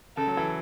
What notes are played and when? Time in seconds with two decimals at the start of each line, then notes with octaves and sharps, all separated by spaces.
0.17 C#3 A4
0.27 F#3
0.37 E3